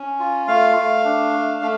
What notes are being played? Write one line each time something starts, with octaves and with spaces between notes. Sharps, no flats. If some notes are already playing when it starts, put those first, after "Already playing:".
Already playing: C#4
F4
A3 F5
A3
D4
A3
A3